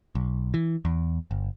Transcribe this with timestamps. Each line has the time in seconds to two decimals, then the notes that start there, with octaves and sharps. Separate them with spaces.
0.15 B1
0.54 E3
0.85 E2
1.31 G1